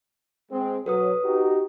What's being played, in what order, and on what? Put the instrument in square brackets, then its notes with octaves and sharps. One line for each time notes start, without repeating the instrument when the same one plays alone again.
[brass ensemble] G#3 C4
[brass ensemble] B1 F#3 [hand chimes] A4 B4 D#6
[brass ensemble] D#4 F#4 G4